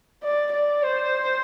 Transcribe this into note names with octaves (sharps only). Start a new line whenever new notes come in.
D5
D5
C5